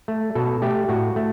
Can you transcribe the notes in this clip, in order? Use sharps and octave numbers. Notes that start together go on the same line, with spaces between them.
A3
B2 A4
A3 G4
A2 F#4
A3